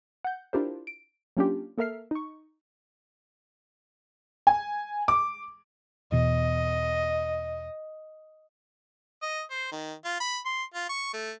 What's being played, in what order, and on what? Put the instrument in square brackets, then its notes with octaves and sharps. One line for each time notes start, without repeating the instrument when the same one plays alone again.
[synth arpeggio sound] F#5 G6
D4 E4 F4 G4 A#4 C5
D7
F#3 A#3 C#4 D4 F4 G4
A#3 A4 A#4 E5 F6 C7
D#4 C#6
[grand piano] G#5
D6
[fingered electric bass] E2 B2 [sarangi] D#5
[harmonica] D#5
C5
D#3
F4
B5
C6
F4
C#6
A3